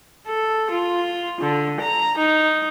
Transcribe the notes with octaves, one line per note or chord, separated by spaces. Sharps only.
A4
F4
D3
A#5
D#4